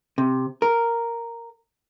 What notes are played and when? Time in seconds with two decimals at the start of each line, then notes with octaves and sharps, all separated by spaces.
0.18 C3
0.62 A#4